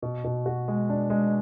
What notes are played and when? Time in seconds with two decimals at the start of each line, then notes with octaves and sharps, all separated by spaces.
0.02 B2
0.24 B2
0.46 F#4
0.68 G#3
0.89 D4
1.10 G#3